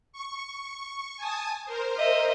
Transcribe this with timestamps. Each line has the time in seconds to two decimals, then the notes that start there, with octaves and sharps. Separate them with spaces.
0.13 C#6
1.17 G#5 A5 D#6
1.65 A#4 C5
1.97 D#5 E5